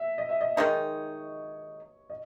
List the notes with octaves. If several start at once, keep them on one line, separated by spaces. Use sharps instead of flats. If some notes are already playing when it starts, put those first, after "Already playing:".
Already playing: E5
D#5
E5
D#5
D#3 G#3 D#4 C#5
D#5